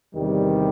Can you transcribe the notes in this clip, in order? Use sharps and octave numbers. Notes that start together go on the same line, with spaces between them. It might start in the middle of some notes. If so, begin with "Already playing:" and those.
E2 C3 D#3 G3